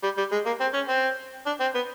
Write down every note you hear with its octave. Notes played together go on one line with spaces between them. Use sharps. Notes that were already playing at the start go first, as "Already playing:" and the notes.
G3
G3
G#3
A#3
C4
C#4
C4
D4
C4
B3